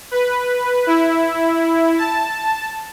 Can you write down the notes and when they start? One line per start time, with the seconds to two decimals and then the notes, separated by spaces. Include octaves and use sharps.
0.11 B4
0.87 E4
1.98 A5